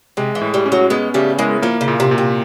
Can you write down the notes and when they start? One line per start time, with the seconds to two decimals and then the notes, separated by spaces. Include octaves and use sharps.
0.17 C3 G#3
0.35 E3
0.41 A2
0.54 G3
0.66 C#4
0.72 F#3
0.90 G#3 B3
1.14 C#3 G3 A3
1.39 G#3 A#3 E4
1.62 F3 A#3
1.81 C#3
1.88 A#2
2.00 C3
2.11 A#2
2.18 C3